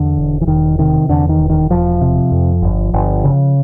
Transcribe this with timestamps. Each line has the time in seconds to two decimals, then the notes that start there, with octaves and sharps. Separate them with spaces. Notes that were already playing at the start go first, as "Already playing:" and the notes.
Already playing: E2 D3
0.17 E1
0.41 E3
0.47 E1 D#3
0.78 C3 D#3
1.09 E2 D3
1.29 D#3
1.39 E1
1.50 D#3
1.70 E1 F3
2.01 C3
2.32 F2
2.62 G1
2.94 G1
3.24 C#3